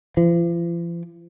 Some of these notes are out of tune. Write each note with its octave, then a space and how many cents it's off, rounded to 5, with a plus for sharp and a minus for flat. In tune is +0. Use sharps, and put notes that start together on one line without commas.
F3 -45